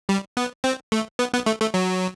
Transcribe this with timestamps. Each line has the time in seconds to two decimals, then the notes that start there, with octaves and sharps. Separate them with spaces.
0.09 G3
0.37 B3
0.64 C4
0.92 A3
1.19 B3
1.34 B3
1.46 A3
1.61 A3
1.74 F#3